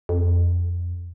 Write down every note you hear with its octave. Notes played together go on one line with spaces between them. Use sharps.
F2